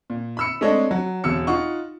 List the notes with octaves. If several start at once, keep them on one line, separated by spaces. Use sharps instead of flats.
A#2
B5 E6 C#7
G#3 A3 C4 D4 C#5 D#5
F#3
E1 E2 E6 C#7
D#4 F4 F#5 C#6